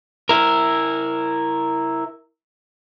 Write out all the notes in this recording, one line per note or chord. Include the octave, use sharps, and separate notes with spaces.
E4 A#4